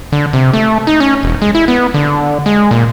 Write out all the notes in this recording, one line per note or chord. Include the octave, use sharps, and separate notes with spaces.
D3
C3
A3
D#4
C#4
E1
G#3
E4
B3
D3
G#3
A#2